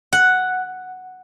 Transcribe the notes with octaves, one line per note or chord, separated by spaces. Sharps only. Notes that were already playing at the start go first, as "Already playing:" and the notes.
F#5